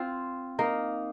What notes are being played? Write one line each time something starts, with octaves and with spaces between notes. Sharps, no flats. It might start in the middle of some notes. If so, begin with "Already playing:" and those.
Already playing: C4 F4
A#3 D#4